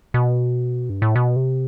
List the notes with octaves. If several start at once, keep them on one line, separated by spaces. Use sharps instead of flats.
B2
G2
A2
B2
C3